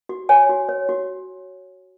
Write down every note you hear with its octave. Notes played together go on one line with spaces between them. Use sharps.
F#4
C#5 G#5
F#4
C#5
F#4